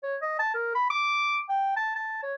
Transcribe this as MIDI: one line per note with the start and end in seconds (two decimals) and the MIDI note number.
0.03 0.16 73
0.22 0.34 75
0.39 0.50 81
0.54 0.74 70
0.75 0.86 83
0.90 1.39 86
1.49 1.73 79
1.76 1.92 81
1.95 2.22 81
2.23 2.34 73